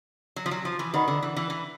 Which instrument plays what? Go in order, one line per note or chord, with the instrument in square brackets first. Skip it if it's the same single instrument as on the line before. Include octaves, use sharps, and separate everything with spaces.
[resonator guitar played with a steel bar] F#3
F3
F#3
F3
E3
[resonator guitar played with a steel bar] D#3 [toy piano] F#4 B4 D5 F#5 B5
[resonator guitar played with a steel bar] D3
E3
E3
E3